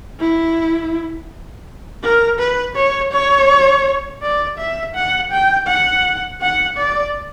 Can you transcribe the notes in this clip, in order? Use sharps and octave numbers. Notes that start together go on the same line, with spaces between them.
E4
A#4
B4
C#5
C#5
D5
E5
F#5
G5
F#5
F#5
D5